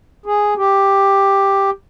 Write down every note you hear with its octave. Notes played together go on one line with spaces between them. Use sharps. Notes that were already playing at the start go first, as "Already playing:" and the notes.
G#4
G4